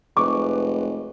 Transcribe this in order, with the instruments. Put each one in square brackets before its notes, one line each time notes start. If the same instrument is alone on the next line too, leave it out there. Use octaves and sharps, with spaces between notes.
[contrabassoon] F1 [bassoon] G#3 [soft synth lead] B4 [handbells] C#6 D6